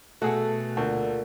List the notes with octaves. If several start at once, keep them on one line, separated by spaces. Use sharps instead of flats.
B2 A3 F#4 G#4 A4 F#5
D2 A#2